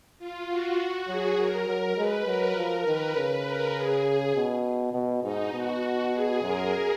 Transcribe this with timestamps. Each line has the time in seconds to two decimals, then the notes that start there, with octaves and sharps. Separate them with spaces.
0.19 F4
0.48 F#4
1.07 F#3 G#4
1.37 F#3 A#4
1.68 F#3
1.97 G#3 B4
2.26 F#3 A#4
2.56 F3 A#4
2.85 D#3 B4
3.16 C#3
3.45 A#4
3.75 G#4
4.35 B2
4.94 B2
5.23 G#2 D#4
5.53 B2 F#4
5.83 F#4
6.13 G#4
6.42 F#2 A#4